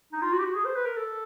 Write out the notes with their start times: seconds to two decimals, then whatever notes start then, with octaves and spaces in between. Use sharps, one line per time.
0.12 D#4
0.22 F4
0.33 F#4
0.39 G4
0.44 F#4
0.55 G#4
0.65 C5
0.76 B4
0.86 A#4
0.97 A4